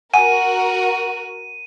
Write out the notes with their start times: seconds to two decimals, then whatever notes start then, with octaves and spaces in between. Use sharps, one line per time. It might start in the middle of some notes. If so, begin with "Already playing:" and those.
0.14 F#4 A#4 F#5 G#5 D#7